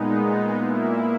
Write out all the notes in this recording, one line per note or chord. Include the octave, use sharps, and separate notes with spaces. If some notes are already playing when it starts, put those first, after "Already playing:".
Already playing: A#2 G#3 B3 D#4
A#2 A#3 E4